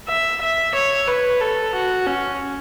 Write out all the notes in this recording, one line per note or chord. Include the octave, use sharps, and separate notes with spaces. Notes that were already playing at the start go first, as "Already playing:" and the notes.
E5
E5
C#5
B4
A4
F#4
C#4